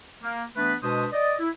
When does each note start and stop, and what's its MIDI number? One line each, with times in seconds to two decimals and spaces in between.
0.22 0.43 58
0.56 0.74 52
0.56 0.74 57
0.56 0.74 59
0.56 0.74 62
0.56 0.74 71
0.83 1.06 47
0.83 1.06 56
0.83 1.06 62
0.83 1.06 71
0.83 1.06 72
0.83 1.06 87
1.13 1.35 74
1.13 1.35 75
1.39 1.49 64